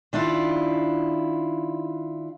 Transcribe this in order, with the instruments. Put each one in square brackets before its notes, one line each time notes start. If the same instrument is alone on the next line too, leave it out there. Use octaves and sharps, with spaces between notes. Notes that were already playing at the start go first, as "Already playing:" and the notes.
[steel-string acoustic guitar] D#3 D4 E4 F4